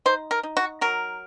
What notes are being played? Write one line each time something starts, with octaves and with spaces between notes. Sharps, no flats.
D#4 C5
A#4
D#4
F#4
F#3 A#4